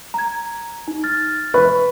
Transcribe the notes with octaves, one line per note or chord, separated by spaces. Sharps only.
A#5 G#6
D#4
F6 A6
B4 C#6